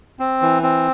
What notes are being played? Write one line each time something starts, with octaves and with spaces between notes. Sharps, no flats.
C4
E3
C4